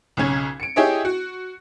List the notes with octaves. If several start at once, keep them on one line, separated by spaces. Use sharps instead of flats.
B1 C#3 C#4 G#6
C#7 D7
E4 G4 G#4 C#5 D#5 E5
F#4